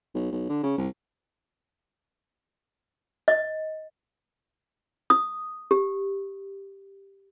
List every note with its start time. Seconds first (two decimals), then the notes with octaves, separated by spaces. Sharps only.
0.14 B1
0.32 B1
0.49 D3
0.63 C#3
0.78 C2
3.28 D#5
5.10 D#6
5.71 G4